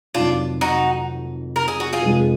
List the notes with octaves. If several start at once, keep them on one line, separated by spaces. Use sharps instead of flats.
F1 F2 D#3 F#3 D4 F4
D#4 F#4
A#4
G#4
F#4
F4 G#4
F1 F2 F3 G#3